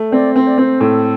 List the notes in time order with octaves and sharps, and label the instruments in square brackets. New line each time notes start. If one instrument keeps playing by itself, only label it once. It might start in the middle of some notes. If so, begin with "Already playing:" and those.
Already playing: [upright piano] A3
[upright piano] C4 [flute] D5
[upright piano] C4 [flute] C5
[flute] D5
[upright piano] C4 [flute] C5
[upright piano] A2 [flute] A4